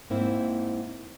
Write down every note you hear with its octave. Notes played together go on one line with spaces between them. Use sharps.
G#2 A#3 C4 E4